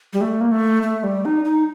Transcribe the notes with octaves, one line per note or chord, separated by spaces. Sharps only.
G3
A3
A#3
A3
A3
G3
D#4
D#4